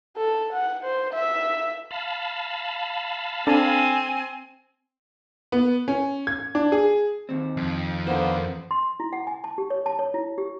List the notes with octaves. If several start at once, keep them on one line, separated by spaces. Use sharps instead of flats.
A4
F#5
C5
E5
F5 A5 B5
C4 D4 A4 G#5
B3
C#4
G#6
D4
G#4
D#2 C4
F2
D3 A#3 B3 C5
C6
E4
F#5
G#5
A5
G4
C#5
A5
C#5
E4
G4